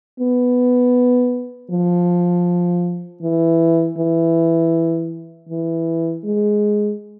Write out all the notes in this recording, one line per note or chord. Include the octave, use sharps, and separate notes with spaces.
B3
F3
E3
E3
E3
G#3